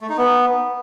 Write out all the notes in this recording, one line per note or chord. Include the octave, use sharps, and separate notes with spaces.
A3
D#4
B3